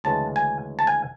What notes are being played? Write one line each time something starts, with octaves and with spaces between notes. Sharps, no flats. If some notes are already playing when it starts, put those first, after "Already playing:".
D2 C#3 E3 G#3 A5
G#5
A5
G#5